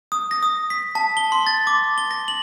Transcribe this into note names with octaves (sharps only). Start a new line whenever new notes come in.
D#6
A#6
D#6
B6
A5
G7
C6
A6
D6
G7
A#6
F#7